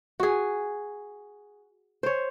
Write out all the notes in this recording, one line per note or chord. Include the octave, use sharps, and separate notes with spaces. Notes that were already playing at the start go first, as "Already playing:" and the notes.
F#4 G#4
C5 C#5